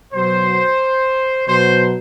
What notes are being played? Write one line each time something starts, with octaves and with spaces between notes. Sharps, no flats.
B2 F#3 C5
B2 F#3 C5